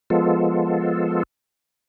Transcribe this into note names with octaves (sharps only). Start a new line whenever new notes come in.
F3 G#3 B3 F4 A4